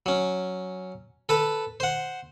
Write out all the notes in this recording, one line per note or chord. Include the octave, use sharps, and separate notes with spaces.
F#3 C#4
A4 B4 A5
C5 F#5